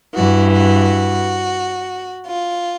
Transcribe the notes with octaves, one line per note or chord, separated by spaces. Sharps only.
G2 E3 F#4
F#4
F4